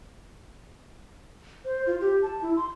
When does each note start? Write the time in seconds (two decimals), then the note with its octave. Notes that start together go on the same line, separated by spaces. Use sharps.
1.65 C5
1.87 F4
2.01 G4
2.22 A5
2.41 E4
2.56 C6